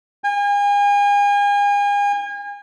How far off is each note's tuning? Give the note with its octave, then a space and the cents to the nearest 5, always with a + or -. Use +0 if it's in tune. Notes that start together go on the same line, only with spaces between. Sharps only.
G#5 -40